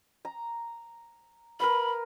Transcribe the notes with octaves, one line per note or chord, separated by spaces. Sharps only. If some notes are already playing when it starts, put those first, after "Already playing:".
A#5
A#4 B4 F5 B5